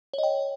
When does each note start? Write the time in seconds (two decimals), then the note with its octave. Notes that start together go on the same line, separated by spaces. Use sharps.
0.14 C#5
0.18 D#5
0.23 G5